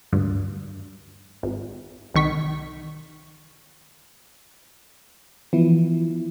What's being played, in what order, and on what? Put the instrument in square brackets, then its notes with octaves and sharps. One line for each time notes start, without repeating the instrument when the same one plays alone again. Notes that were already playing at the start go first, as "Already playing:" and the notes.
[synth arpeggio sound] D2 G2
G#1
C2 D#3 C#6 B6
[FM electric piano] E3 F3 B3 E4